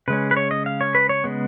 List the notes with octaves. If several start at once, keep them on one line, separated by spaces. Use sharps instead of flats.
C#3 G#3 C#4 B4
B4
C#5
D#5
F5
C#5
B4
C#5
C#3 G#3 B3